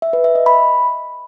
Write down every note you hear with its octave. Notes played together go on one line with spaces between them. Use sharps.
E5
B4
E5
D#5
B5